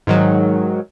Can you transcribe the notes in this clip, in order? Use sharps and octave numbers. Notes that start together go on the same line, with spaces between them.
G#2 D#3 F#3